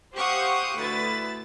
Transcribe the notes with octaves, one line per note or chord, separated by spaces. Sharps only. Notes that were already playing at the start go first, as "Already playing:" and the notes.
G4 C5 F5 F#5 C#6 D#6
D2 E4 B4 A6